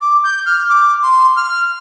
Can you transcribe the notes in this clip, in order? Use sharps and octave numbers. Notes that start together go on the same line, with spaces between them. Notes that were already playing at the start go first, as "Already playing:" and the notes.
D6
G6
F6
D6
C6
F6